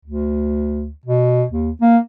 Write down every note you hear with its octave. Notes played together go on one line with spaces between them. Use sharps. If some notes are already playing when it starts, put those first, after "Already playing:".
D2
B2
D#2
A#3